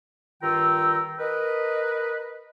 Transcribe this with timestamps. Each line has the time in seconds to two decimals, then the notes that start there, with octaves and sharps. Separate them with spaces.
0.42 G2 D#3 F4 G5 A#5 E6
1.20 A#4 B4 D#5